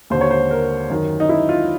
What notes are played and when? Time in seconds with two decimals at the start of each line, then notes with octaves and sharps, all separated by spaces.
0.10 D#2 D3 C5
0.21 C#5
0.31 C5
0.51 A#4
0.90 F#2 D#3
1.20 D#4
1.29 E4
1.49 F4